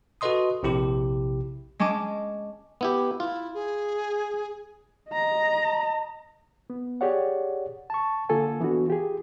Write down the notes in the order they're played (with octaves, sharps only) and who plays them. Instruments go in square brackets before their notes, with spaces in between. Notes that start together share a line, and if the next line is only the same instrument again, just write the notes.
[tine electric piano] F#4 A4 B4 D#5 C6 D#6
A#1 C3 E4 G4
[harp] G#3 C#4 A5 D6
[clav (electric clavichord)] B3 E4 G4
[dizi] E4 [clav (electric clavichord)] F4
[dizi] G#4
[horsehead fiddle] D#5 A#5
[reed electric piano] B3
G4 G#4 C#5 D5 F#5
A5 C#6
D3 A#3 F4 A4 G#5
E3 B3 D4 F#4
F4 G4 G#4